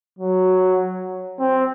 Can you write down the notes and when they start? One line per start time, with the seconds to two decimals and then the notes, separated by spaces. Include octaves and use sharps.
0.18 F#3
1.39 C4